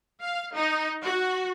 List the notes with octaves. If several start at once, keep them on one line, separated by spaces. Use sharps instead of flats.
F5
D#4
F#4